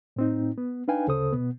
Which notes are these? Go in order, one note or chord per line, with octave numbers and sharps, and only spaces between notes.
A2 C4 D#4
B3
D4 D#4 B4 F5 G5 G#5
D2 C#3 A4 C5 D#6
B2 B3